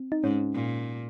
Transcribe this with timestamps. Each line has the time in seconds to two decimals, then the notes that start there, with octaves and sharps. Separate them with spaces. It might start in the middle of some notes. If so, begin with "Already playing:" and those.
Already playing: C4
0.12 D#4
0.24 G#2 C#4
0.53 A#2